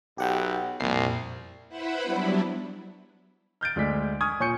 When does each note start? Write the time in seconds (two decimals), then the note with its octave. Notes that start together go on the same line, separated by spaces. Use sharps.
0.18 B1 G4 F#5 G5
0.80 C2 F2 A#2 C7
1.69 E4 B4 C5 E5 F#5 B5
2.01 F#3 G3 B3 D4 E4
3.61 F6 G6 A6 D7
3.76 D2 G#3 D5 B6
4.21 G#5 C#6 D#6 F6 G#6
4.40 A#2 C#5 G#5 C#6 G6 C#7